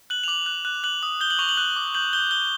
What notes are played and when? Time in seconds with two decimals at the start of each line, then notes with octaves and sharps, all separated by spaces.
0.10 F#6 F#7
0.24 F7
0.28 D6 F#7
0.46 F#6
0.65 F#6
0.84 F#6 F#7
1.03 D#6
1.21 G6 G7
1.30 F#7
1.39 C#6 F7
1.49 F#7
1.57 F#6
1.76 D6
1.95 G6 F#7
2.13 G6 G7
2.31 F#6 G7